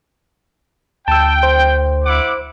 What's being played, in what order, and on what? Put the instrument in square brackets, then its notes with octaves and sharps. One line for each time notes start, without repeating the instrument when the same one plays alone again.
[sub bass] D2 [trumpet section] G5 [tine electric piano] A5 E6
[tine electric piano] C5
[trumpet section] E4 F#5 D6